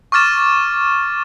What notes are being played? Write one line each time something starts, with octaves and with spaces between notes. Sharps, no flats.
C#6 D6 F6 A6 E7